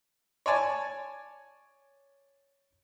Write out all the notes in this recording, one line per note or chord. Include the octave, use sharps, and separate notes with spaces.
C#5 D5 G#5 A5